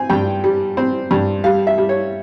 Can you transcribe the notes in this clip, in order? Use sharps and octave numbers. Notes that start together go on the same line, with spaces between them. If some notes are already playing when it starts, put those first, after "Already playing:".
Already playing: C4 G#5
G2 G5
G3
C4
G2
G3 F5
E5
G3
C#5